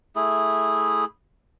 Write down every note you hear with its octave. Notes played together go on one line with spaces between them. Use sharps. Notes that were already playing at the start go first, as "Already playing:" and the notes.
A3 E4 G#4